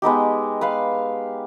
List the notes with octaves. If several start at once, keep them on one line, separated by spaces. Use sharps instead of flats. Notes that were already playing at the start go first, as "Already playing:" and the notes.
G#3 B3 D#4 G4
B4 F5